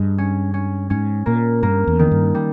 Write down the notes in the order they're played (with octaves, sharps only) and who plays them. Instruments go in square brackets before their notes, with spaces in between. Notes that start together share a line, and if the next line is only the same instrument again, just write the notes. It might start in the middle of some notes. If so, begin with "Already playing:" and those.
Already playing: [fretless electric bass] G2 [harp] G#3
[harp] C#4
C#4
[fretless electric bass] G#2 [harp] C#4
[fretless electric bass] A#2 [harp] A#3
[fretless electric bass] G2 [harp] A#3
[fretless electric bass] E2
[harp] D#3
[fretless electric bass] G2
[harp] G3